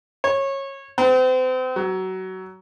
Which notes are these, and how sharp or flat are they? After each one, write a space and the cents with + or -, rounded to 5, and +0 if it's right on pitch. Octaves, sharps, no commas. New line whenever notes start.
C#5 -20
C4 -35
F#3 +20